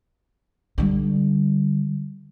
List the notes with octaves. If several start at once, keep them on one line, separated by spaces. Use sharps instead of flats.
D3 G3